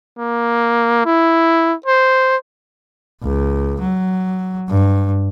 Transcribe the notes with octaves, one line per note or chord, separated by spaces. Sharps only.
A#3
E4
C5
C#2
F#3
G2